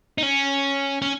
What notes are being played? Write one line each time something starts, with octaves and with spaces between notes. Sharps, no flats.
D#4
C#4
C#4